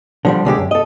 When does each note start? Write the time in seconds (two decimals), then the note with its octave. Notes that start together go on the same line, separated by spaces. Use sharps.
0.25 D3 F3 G3
0.45 C2 D3 G#3 G4
0.58 F#2
0.71 A4 D#5